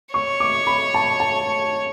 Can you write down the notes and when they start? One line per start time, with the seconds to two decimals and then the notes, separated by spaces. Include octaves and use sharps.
0.14 C#5 C#6
0.40 D6
0.67 B5
0.94 A5
1.20 A5